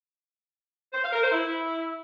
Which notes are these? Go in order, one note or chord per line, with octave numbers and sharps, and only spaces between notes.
C5
F5
A#4
C5
E4